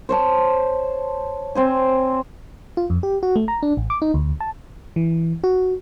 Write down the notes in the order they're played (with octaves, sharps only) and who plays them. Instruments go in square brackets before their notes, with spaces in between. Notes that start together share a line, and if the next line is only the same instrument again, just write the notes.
[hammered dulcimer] C5 C#5 A5
C4 C5 G#5
[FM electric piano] F4
F2
G4
F#4
A3
A#5
D4
A1
D6
D#4
D2
A5
E3
F#4